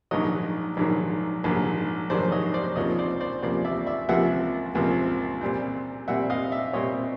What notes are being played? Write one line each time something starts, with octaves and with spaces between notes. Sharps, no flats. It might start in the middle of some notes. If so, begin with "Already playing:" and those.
A#1 G#2 D#3 F#3 C#5 D#5
A#1 G#2 D#3 F#3
A#1 G#2 D#3 F#3
A#1 G#2 D#3 F#3 C5 D5
C#5 D#5
C5 D5
C#2 C3 F3 A#3 C#5 D#5
C5 D5
C5 D5
C#2 C3 F3 A#3 C5 D5
D5 E5
D5 E5
C#2 C3 F3 A#3 E5 F#5
C#2 C3 F3 A#3
A#2 G3 C4
A#2 G3 C4 E5 F#5
D#5 F5
D5 E5
A#2 G3 C4 C#5 D#5